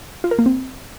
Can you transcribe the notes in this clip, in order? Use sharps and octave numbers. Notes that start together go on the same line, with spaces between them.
F4
A#4
A#3
C4